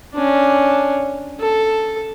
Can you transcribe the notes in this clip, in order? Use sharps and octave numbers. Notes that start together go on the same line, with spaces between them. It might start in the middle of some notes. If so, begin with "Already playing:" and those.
C#4 D4
A4